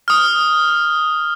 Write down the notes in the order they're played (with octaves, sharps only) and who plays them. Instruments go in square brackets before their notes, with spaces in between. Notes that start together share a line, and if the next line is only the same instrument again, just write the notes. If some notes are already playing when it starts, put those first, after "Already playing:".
[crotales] D#6 F6